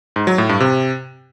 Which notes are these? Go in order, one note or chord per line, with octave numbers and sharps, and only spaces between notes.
G#2
F#3
A2
G2
C3